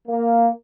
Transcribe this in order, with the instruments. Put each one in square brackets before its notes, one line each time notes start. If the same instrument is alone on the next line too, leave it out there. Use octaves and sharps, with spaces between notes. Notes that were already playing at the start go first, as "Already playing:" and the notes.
[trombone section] A#3